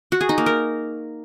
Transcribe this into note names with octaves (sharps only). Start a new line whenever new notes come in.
F#4
G#4
D#4
A#3
A#4